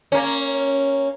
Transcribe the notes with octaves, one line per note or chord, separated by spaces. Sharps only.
A#3 C#4